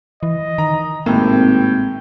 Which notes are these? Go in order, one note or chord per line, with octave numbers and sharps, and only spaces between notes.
E3 D#5
D#3 A#5
G#1 A2 C3 A#3 G5